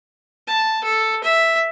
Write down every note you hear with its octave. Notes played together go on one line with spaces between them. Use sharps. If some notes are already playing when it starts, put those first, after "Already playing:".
A5
A4
E5